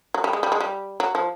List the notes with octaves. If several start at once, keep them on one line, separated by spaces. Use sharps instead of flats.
F#3
G3
G#3
G3
G#3
G3
F#3
F3